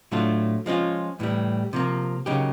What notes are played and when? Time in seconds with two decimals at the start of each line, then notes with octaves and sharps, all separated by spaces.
0.12 A2 F#3 A3 D4 F4
0.66 F3 G#3 C#4 F4
1.20 A2 E3 G3
1.73 C3 F3 A#3
2.26 C#3 F#3 A#3 D#4 G4